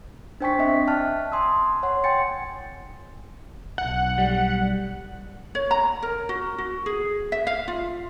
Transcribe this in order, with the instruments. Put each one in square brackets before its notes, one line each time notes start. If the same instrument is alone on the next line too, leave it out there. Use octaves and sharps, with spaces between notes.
[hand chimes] D4 C5 G5 G#5 C#6 B6
C4 D#5 E5 B6
D5 G5 A5 F6 F#6
G#5 C6 D#6 E6
C#5 F#5 C6
G5 G#5 C6 A6 C#7
[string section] B1 [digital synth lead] F#5
[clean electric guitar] G3
[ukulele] C#5
A#5
A#4
F#4
F#4
G#4
E5
F5
F4